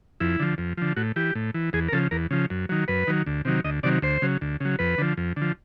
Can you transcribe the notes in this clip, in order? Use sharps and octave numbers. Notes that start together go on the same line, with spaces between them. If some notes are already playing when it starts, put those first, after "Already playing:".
F2 E4
D3 F3
F2
D3 F3
A2 F#4
E3 G4
A2
E3
E2 G#4
A#4
C#3 F3 A4
E2 A#4
C#3 F3
F#2
D#3 F#3
F#2 B4
D#3 F#3
D2
C3 D#3 F#3
D2 D#5
C3 D#3 F#3 D5
D2 C5
C#3 F#3
D2
C#3 F#3
F2 B4
D3 F3
F2
D3
F3